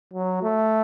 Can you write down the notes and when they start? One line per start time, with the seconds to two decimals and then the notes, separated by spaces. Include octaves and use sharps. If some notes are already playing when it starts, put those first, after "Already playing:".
0.13 F#3
0.43 A3